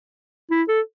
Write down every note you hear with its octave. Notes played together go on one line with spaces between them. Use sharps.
E4
A4